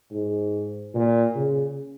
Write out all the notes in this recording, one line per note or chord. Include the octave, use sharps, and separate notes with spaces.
G#2
A#2
C#3